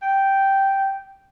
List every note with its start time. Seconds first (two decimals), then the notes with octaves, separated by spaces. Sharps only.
0.02 G5